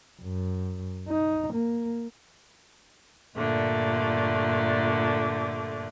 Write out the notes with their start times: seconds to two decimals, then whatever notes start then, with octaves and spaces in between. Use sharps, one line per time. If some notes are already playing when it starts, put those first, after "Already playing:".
0.22 F#2
1.08 D#4
1.54 A#3
3.36 G2 A#2 D3 A3